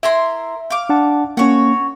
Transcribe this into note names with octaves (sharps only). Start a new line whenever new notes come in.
E4 A#4 E5 C6
F5 D6
D4 F#5 A5
A#3 C#4 F#4 C#5